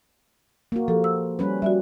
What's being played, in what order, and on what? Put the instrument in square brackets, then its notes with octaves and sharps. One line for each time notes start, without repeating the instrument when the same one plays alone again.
[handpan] A#3 F#4
[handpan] F3 [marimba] G4 A4
[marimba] E6
[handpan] G3 C#4 B4
[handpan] G3 [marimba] F#4 D5 E5